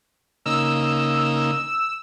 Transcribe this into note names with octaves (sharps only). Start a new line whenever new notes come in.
C#3 A#3 D#4 E6